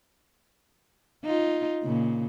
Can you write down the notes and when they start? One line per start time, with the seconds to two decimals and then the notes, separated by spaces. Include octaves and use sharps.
1.24 D#4 F4
1.83 A#2 C#3